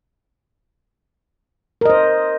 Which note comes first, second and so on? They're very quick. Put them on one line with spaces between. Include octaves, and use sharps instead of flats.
A#4 D#5 C5